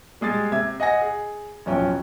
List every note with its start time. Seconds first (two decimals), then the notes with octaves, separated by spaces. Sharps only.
0.21 G3 G#3 D#6 A6 C7
0.52 C3 E5 G#6
0.80 D#5 F#5 G#5 A#6
1.02 G#4
1.66 D1 B1 F3 C#4 E5 G5